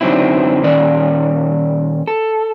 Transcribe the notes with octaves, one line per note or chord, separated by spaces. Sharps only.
F#2 D3 F#3 C4 D#4 E4
A#2 D#3 C#4 D5
A4